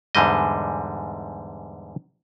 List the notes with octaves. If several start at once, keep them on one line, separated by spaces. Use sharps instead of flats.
E2 G#2 D3 G3 D#5